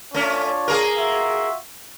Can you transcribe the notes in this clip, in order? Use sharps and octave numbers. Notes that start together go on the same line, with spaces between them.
A3 C#4 D4 F4 C#5
A#3 G#4 A#4
F4 F#4 E5